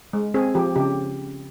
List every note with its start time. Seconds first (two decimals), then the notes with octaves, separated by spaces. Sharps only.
0.13 G#3
0.34 C4 G#4
0.55 F3 G4
0.76 C#3 G4